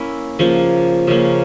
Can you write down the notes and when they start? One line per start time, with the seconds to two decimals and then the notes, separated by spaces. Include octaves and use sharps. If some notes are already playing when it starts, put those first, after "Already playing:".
Already playing: A#3 C#4 E4
0.39 C#3 F3 A#3 C#4
1.07 C#3 F3 A#3 C#4